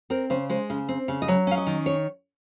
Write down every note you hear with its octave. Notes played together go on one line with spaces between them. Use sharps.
C4 A#4
C#3 C5
G#3 C5
C#3
C4
C#3
D#5
F#3 C#5
C#4 F5
D#5
D#3
C#5